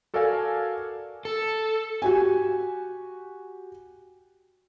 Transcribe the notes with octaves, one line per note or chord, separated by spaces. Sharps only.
F#4 A4 A#4 D5 F5 G#5
A4
F#4 G4 G#5